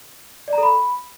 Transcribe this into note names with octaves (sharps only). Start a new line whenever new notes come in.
D5
A#5
A4
B5